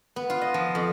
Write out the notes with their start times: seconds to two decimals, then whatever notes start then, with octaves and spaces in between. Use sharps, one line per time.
0.16 B3
0.30 F4
0.41 D#5
0.54 F3
0.75 F2